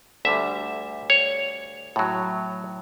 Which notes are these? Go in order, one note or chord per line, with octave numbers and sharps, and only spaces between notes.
D2 D3 G3 E5
C#5
A2 F#3